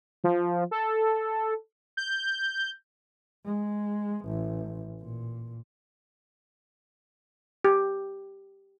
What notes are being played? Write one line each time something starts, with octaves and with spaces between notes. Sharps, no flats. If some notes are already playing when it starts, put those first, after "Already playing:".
F3
A4
G6
G#3
A1
A#2
G4